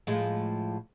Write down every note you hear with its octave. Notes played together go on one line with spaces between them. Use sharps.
A2 F3 G#3